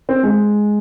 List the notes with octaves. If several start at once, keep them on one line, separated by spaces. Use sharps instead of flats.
C4
G#3